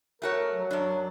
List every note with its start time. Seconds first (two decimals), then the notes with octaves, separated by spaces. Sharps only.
0.22 A3 F#4 A#4 C#5
0.52 F#3
0.71 F#2 D4